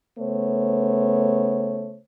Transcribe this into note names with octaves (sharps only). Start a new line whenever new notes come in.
C#3 A3 B3 C5 C#5